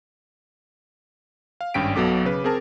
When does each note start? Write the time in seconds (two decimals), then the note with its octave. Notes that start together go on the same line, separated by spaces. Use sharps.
1.61 F5
1.74 G#1 G2 C#4 G5 B6 D7
1.96 B1 B2 F#3 A4 D6
2.25 C#3 B4
2.44 C4 G#4 A#4 A5